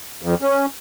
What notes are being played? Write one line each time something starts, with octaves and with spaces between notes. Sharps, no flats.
F2
C#4